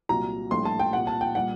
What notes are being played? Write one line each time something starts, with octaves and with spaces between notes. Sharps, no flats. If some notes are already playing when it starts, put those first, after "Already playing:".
C2 A#2 F#3 A#5
A#1 A2 G3 C6
A5
G5
C2 A#2 G3 F#5
A5
G5
A#2 G3 F#5